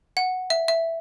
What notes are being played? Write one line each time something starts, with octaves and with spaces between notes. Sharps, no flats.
F#5
E5
E5